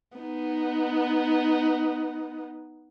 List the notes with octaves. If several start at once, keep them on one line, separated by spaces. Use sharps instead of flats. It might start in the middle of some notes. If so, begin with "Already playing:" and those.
B3 D#4